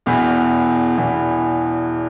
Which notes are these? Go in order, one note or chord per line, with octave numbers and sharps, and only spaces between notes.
E1 E2 E3
E1 E2 E3